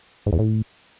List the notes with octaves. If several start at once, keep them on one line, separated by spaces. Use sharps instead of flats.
G#2
E2
A2